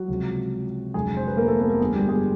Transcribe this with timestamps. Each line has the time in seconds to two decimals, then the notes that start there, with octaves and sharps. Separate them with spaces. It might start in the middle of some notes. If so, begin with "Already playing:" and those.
Already playing: F#3 F#4
0.08 C#2 C3 F3
0.94 F1 F2 D3 F#3 G#3 G#4
1.17 C5
1.28 B4
1.37 A#3 A#4
1.47 A3 A4
1.59 B3 B4
1.70 A#3 A#4
1.80 G1 G2 D3 F3 G#3 G#4
1.95 G3 G4
2.09 G#3 G#4